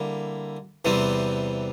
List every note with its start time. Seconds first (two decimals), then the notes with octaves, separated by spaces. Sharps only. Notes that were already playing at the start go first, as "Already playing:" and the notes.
Already playing: D3 G3 A#3 E4
0.85 E2 C3 E3 G3 C4